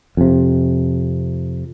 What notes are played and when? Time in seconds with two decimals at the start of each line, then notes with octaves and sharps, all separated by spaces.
0.17 F2 C3